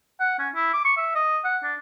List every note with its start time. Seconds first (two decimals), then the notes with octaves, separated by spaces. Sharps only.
0.20 F#5
0.39 C#4
0.55 E4
0.74 D6
0.85 C#6
0.97 E5
1.15 D#5
1.44 F#5
1.63 D4